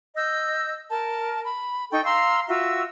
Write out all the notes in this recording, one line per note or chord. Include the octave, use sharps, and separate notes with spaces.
D#5 E6 G6
A#4 A5
B5
D#4 A4 G5 C#6
F5 A#5 C6 E6
F4 F#4 E5 E6